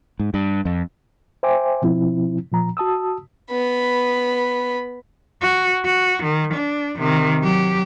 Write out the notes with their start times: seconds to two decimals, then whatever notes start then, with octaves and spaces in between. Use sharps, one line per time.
0.20 G#2
0.34 G2
0.65 F2
1.43 C5 E5 G5 G#5 C6 D6
1.82 B2 F3 C4 E4
2.52 A#2 F3 A#5
2.77 F#4 A5 D#6 E6
3.51 B3 B5
5.42 F#4
5.86 F#4
6.23 D#3
6.54 D4
6.96 C3 D#3
7.42 F#3 G4